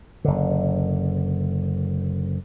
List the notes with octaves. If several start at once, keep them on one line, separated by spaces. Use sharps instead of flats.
F#1 D3